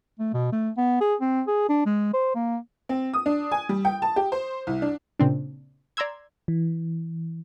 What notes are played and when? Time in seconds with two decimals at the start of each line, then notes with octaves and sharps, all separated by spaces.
0.20 A3
0.34 B2
0.52 A3
0.77 B3
1.01 G#4
1.21 C4
1.47 G#4
1.69 D4
1.86 G#3
2.13 C5
2.35 A#3
2.89 C4
3.13 D#6
3.26 D4
3.51 G#5
3.69 G3
3.85 G5
4.02 A5
4.16 G4
4.32 C5
4.67 C2
4.82 D4
5.19 A#2 C#3 C4 D4
5.97 D5 A#5 C6 E6 G#6
6.48 E3